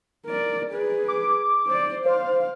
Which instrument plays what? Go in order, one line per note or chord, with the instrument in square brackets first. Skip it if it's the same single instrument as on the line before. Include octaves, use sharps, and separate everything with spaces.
[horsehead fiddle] A#4 D5
G#4 B4
[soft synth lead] D6
[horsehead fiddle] C5 D5
[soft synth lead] C5 [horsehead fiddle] F5